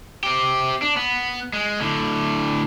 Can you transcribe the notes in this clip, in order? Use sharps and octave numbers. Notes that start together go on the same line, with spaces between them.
C4 G4
D4
B3
G#3
A2 D3